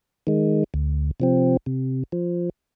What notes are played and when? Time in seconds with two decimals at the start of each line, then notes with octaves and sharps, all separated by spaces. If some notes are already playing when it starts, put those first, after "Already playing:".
0.27 D#3 G#3
0.74 D2
1.20 C3 F3 C4
1.66 C3
2.12 F3